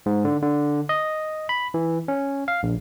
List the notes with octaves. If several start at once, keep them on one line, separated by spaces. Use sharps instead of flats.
G#2
D3
D3
D#5
B5
E3
C#4
F5
A#1